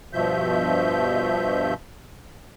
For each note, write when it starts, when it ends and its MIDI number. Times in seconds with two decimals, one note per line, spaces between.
0.13 1.74 43
0.13 1.74 47
0.13 1.74 53
0.13 1.74 76
0.13 1.74 91